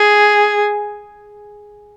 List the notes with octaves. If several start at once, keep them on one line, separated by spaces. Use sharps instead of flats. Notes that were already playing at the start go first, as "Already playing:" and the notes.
Already playing: G#4